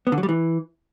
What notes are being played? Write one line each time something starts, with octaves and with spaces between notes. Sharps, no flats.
B3
D3
F#3
G3
E3